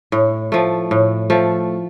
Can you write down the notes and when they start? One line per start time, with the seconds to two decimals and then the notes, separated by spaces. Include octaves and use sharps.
0.12 A2
0.52 F3 A3
0.91 A2
1.30 F3 A3